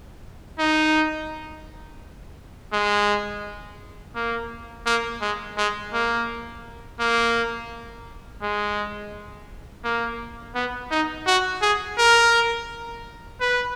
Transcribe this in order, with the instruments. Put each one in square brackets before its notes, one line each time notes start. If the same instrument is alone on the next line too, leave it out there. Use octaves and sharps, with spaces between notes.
[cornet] D#4
G#3
A#3
A#3
G#3
G#3
A#3
A#3
G#3
A#3
B3
D#4
F#4
G#4
A#4
B4